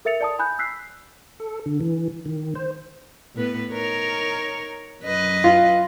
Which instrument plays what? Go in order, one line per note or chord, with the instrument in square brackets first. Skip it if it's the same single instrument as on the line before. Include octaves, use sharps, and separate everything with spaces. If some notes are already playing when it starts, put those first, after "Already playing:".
[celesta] A4 A#4 E5 A6 C#7 F7
D5 A5 D#6
G#5 B5 F#6 G6
E6 F#6 B6 C7
[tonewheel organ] A4
D3
E3
D#3
C5
[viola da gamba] A2 B3 B4
D#4 A#4 C#5
F#2 B4 D#5
[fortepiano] F4